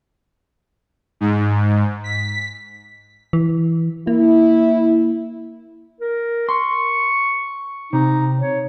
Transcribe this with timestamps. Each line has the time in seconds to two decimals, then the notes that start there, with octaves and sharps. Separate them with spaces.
1.21 G#2
2.04 B6
3.33 E3
4.07 A#3 E4
6.01 A#4
6.49 C6 C#6
7.93 C3 D#4
8.40 C#5